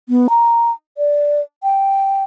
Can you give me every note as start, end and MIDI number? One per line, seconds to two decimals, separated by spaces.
0.09 0.27 59
0.30 0.71 82
0.98 1.41 74
1.63 2.24 79